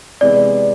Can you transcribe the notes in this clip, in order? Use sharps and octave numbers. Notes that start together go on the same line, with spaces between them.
C3 E3 G#3 B3 D5